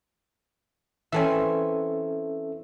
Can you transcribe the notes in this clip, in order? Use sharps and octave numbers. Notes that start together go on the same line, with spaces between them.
E3 C4 C#4 A4 E5 G#5